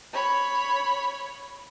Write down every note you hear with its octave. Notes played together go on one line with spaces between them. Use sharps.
C#5 B5